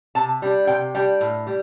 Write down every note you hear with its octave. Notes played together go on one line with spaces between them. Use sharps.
C3 A5
G3 D4
C3 G5
G3 D4 G5
A2
G3